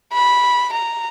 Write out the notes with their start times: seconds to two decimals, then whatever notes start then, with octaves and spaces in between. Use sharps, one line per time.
0.13 B5
0.73 A#5